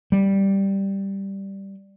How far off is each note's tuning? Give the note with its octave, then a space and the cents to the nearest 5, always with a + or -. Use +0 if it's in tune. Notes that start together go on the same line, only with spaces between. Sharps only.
G3 +0